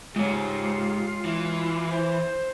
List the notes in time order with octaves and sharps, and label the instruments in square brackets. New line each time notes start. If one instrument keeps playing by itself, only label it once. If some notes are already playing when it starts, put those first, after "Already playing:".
[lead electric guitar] G#2 [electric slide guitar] G#3 C#5 [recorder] F4 [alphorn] G4
[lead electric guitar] E3 [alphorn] E4
[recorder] C5